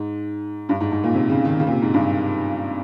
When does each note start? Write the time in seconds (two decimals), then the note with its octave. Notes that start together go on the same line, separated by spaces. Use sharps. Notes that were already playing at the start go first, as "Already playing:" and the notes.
Already playing: G#2
0.69 G2
0.81 G#2
0.92 G#2
1.03 A#2
1.15 C3
1.30 C#3
1.45 D#3
1.60 C#3
1.67 A#2
1.71 C3
1.82 G#2
1.94 G2